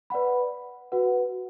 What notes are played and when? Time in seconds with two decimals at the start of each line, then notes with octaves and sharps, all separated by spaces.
0.10 B4 D5 F#5 B5
0.92 F#4 B4 F#5